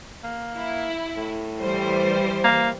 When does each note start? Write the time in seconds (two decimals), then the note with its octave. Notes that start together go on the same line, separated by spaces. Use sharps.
0.24 A#3
0.58 E4
1.17 A2
1.62 E3 G3 C5
2.44 A#3